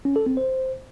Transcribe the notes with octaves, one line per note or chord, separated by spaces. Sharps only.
C#4
A4
C4
C5